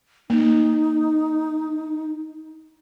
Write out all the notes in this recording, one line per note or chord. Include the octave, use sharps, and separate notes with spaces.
A#3 D#4